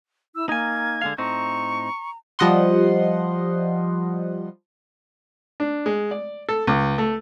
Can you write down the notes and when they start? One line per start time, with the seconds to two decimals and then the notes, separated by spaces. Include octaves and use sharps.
0.35 E4 E6
0.49 A#3 D#4 G#5 G#6
1.02 D3 G#3 F5
1.18 A2 C4 D#4 A#5 C#6
2.39 F3 G3 D#5 F#5 C6
5.60 D4
5.86 G#3
6.11 D5
6.49 A4
6.67 C#2
6.98 A3